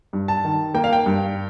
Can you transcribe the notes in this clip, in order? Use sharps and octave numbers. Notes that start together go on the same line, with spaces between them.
G2
A5
D#3
A#3 G5
F5
G5
G2